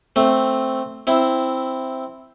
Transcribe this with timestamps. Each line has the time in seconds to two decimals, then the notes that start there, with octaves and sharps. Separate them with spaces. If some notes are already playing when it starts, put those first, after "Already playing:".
0.16 A3 C4
1.07 C4 E4